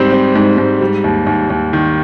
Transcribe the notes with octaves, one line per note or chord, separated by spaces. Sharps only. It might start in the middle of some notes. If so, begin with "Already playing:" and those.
Already playing: G#2 G3 C4 G4
C4
G#2
G#2
G3
D#2
D#2
D#2
D#3